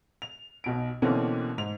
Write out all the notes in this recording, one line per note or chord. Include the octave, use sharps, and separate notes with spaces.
F7
B1 B2 D7
B2 D3 E3 A#3 C4 C#4
G#2 F7